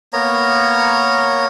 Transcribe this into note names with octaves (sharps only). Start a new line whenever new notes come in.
A#3 B3 C#5 A#5